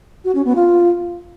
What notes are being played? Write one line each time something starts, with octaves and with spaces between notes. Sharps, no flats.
F#4
C#4
B3
F4